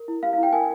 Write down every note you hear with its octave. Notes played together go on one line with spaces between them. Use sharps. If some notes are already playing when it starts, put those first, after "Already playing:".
Already playing: A#4
E4
G4 F5
E4 F5
G5
A#4 G#5